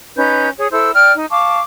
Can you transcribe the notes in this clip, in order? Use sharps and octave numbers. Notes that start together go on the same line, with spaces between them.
C#4 D#4 B4 G6
G#4 C#5 D#6
E4 A4 C5 E6
D5 G5 F6
D#4
F5 A5 C#6 D6